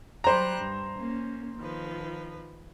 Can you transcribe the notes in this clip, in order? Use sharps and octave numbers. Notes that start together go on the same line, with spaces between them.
F#3 G3 C5 A#5 F#6
G2
A#3 C#4
D#3 F3 B4